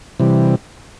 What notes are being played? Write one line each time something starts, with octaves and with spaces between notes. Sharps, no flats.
C3 E3 G3